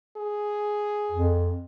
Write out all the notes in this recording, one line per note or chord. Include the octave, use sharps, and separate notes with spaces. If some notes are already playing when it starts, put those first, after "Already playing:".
G#4
F2